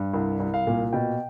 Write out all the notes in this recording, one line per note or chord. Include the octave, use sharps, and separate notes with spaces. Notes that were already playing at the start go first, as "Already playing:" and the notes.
Already playing: G2
C2
C2
F5
A#2
B2 G5